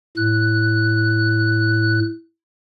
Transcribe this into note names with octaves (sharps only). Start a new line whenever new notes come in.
A2 F#6